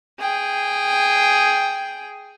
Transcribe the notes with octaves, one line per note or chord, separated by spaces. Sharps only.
G#4 G5